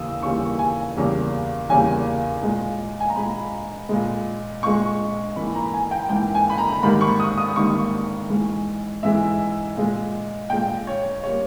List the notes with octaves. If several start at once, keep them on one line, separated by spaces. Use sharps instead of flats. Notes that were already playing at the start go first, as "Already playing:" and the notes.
Already playing: D#2 C#3 E3 G3 A#3 D#6 E6
D#2 C#3 E3 G3 A#3 C#6
G#5
E2 C#3 G3 A#3
E2 C#3 G3 A#3 G#5
A#2 G#3
G#5
A#5
A#2 G#3 B5
A#2 G#3
A#2 G#3 C#6
G#2 E3 A#3 B5
A#5
G#5
G5
G#2 E3 A#3 G5
G#5
B5
A#5
A#5
G#2 D#3 G3 A#3 B5
C#6
D#6
D#6
G#2 D#3 G3 A#3 C#6
G#2 E3 G#3
G#2 E3 G#3 E5
A#2 G#3
A#2 G#3 G5
C#5
G3 A#3 C#5